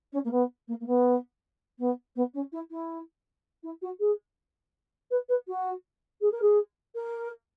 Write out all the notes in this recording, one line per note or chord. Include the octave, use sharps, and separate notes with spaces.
C#4
A#3
B3
A#3
A#3
B3
B3
B3
C#4
E4
E4
E4
F#4
G#4
B4
B4
F#4
G#4
A#4
G#4
A#4